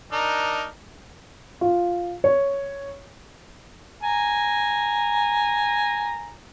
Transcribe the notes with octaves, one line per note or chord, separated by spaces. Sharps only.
D4 D#4 A#4
F4
C#5
G#5 A#5